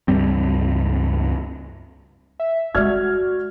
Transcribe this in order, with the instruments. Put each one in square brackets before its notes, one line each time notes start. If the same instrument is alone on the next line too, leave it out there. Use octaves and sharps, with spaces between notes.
[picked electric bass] C#2 G2 G3 C4
[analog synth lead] E5
[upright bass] G2 G#3 [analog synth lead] F#4 [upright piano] D5 F6 G#6